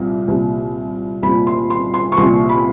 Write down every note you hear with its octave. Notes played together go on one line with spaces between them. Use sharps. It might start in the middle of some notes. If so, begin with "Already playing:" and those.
Already playing: C2 A#2
C2 A#2
C2 A#2 B5
C6
C6
C6
C#6
C2 A#2 C6
B5